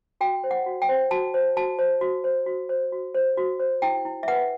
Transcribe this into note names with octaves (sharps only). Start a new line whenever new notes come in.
F#4 G5
C5
F#5
F#4
G5
C5
F#4 A5
C5
F#4 A5
C5
F#4
C5
F#4
C5
F#4
C5
F#4
C5
E4 G5
E4
E5
B4 F#5